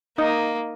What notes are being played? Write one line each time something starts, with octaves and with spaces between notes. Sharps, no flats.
A#3 D#4 D#5